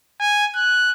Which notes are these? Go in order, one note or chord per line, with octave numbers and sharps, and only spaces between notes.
G#5
F#6